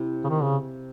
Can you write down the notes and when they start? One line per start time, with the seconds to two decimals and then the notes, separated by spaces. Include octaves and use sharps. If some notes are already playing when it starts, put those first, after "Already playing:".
Already playing: C3 E4
0.24 C#3
0.29 D#3
0.43 C#3